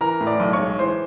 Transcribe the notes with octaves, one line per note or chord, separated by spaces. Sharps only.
E3 A#4 A#5
A2
D5 D6
B1
C#5 C#6
G#3
E3 C5 C6